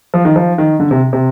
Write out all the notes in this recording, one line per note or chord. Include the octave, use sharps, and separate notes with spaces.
F3
D#3
F3
D#3
D3
C3
C3